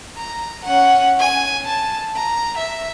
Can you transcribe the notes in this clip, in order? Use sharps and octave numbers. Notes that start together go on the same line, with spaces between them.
A#5
C#4 F#5
G#5
A5
A#5
E5